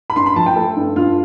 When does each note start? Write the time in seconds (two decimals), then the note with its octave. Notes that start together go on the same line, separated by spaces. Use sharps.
0.10 B5
0.16 G2 C6
0.26 B5
0.36 F3 A5
0.46 G5
0.56 A3 A4
0.76 G2
0.96 G2 F4